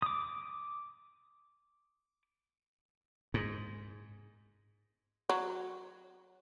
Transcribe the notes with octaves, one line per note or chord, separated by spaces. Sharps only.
D6 D#6
G#2
F#3